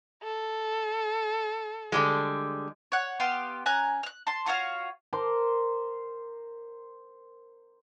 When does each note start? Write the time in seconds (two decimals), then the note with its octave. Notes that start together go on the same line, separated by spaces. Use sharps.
0.23 A4
1.92 D3 G3 G#3
2.92 C#5 F#5
3.20 B3 G4 F5 C6
3.66 C#4 G#5 A#5 F#6
4.03 F6 F#6
4.27 A5 C6
4.46 F4 F#4 C#5 F5
5.13 A#4 C5 C6 D6